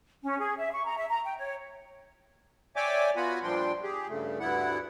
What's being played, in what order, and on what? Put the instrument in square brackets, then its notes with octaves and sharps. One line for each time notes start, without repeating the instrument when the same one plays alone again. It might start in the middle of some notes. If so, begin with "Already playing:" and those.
[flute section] C#4
G#4
E5
C#6
A#5
E5
A#5
G5
C#5
[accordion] C#5 D5 E5 G5 G#5 D6
B3 F4 F#4 F#5 G#5 B5
A#2 F3 G3 D4 G5 C6
G4 G#4
G2 C#3 A3
D2 G2 B3 E4 F#5